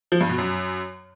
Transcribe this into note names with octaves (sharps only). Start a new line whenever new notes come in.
F3
G2
B2
F#2